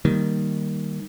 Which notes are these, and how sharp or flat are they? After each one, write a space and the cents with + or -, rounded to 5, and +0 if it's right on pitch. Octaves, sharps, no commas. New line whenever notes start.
D#3 +0 G3 +0 A#3 +0